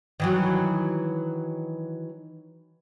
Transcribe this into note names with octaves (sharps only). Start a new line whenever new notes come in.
D#3 E3 F#3